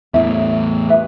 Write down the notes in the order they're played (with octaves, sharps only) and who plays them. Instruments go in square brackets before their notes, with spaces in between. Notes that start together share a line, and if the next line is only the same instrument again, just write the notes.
[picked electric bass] E2 A2 [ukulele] E5
[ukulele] B4 E5